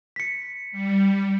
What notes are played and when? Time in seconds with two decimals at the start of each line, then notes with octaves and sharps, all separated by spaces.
0.16 B6 C#7
0.72 G3